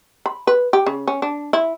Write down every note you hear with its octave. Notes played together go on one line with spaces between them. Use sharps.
B5
B4
G4
C#3
C#4
D4
E4